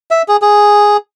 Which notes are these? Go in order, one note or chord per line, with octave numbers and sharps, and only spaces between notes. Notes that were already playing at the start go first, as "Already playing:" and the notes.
E5
G#4
G#4